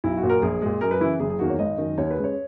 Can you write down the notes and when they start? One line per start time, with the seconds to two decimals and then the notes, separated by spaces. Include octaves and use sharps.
0.04 B1 E4
0.17 F#4
0.23 A#2 F#3
0.30 A#4
0.42 A#1 G#4
0.62 A#2 G#3
0.81 F#2 A#4
0.91 B4
1.00 C#3 E3 E4
1.20 F#1 G#4
1.30 G#4
1.39 E2 D#3 A#3 F#4
1.49 C#5
1.59 G#1 D#5
1.78 F#2 D#3
1.98 D#2 C#5
2.11 B4
2.17 C#3 G#3
2.24 C#5